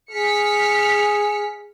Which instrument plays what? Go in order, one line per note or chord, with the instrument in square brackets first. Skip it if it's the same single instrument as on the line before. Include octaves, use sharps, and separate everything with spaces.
[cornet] G#4 [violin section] F6 B6 C#7